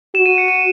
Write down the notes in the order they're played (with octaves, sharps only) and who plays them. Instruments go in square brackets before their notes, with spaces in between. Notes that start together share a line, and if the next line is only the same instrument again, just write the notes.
[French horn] F#4 [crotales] E7
[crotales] D#7
C#7
D#7